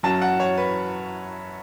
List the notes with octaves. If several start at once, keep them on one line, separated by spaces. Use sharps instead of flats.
F#2 F#3 A5
F#5
C#5
B4